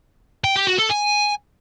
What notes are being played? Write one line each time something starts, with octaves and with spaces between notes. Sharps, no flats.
G5
G4
F#4
A4
G#5